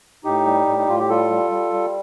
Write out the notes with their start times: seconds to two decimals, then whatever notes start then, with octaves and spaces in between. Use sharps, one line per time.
0.24 A2 D#4 G4
0.46 G3
0.67 A2
0.78 D#4
0.88 A2 F4
0.99 G4
1.09 G3 F4 A4
1.31 G3
1.51 G3
1.73 G3